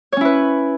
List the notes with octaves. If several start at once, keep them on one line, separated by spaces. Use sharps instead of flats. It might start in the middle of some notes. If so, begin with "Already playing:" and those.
C#4 E4 B4 C#5